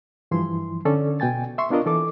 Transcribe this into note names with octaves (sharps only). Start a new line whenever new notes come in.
G2 E3 F3 E4 C6
D3 C#4 A4 D5
B2 G5 G#5 A6
E5 C6 C#6
B3 D4 F4 A#4 D#5
E3 A4 D6